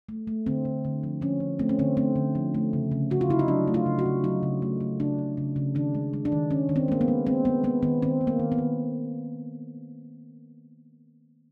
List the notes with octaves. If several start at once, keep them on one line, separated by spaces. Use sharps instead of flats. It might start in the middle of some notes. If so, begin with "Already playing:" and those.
A3
A3
D3 C4
D3
D3
F3
F3 C#4
F3
A3 C4
C#4
D3 C4
A3 C4
D3
F3
A3
C#3
C#3
C#3 F#4
F4
C#3 E4
D#4
F#3 D4
A3
F4
C#3
F#4
C#3
F#3 D#4
C#3
A3
A3
C#3 D4
C#3
C#3
C#3
D#3 D4
G#3
G#3
D4
D#3
D#3 C#4
D#3
C4
G#3 A#3
B3
G#3
G#3 C4
G#3 B3
G#3 B3
D#3 B3
D#3 C4
D#3
A#3
D#3
B3
D#3